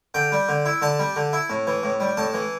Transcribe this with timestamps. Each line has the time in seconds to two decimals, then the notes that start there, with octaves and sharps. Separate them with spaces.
0.14 D3 G5
0.32 G3
0.49 D3
0.66 E4
0.82 D3 A5
0.99 G3
1.16 D3
1.33 E4
1.50 A2
1.67 E3
1.83 A2
2.00 G3
2.17 A2 A5
2.34 E3